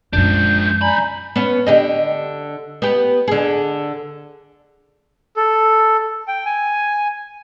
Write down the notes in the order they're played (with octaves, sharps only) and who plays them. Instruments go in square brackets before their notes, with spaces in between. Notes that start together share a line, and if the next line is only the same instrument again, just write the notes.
[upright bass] F#2 G#3 [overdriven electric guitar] F3 D4 [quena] G6
[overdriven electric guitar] B1 B5 [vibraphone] D5 G#5 A#5
[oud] B3 C#4
D3 G4 D#5
B3 G4
D3 G#4
[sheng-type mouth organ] A4
G5
G#5